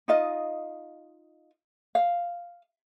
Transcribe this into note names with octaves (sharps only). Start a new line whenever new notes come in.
D#4 F4 D#5
F5